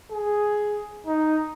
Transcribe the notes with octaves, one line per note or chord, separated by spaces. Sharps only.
G#4
D#4